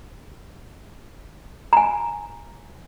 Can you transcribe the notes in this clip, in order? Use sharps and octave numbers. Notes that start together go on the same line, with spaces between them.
G#5 A#5